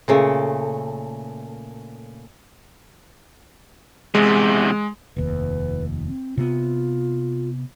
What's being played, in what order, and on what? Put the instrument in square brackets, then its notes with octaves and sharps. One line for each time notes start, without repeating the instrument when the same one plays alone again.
[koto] A#2 C#3 A3
[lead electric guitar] E2 C3 [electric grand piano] G#3
[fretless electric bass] F1 D#2 [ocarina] B4
[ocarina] C4
[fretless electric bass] C3 B3 [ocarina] F4